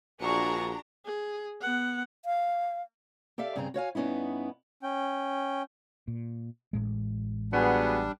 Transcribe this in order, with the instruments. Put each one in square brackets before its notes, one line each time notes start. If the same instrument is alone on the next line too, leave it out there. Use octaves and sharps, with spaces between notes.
[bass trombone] A#1 [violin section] D4 A#5 [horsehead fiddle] F4 F#4 [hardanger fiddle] G#4 C#6
[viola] G#4
B3 F#5
[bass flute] F5
[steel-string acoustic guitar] G4 A4 D5 E5 F5
G2 C#3 C4 G#4 A#5
F#4 C#5 F5 G#5
G2 B3 C#4 D#4 E4
[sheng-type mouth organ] C#4 G5
[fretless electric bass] A#2
A1 A2 G#3
[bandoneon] G3 D4 [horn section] B3 F#4 G#4